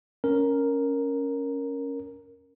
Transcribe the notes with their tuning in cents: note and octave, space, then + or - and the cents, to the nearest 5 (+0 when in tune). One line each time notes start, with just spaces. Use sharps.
C#4 +0 A#4 +0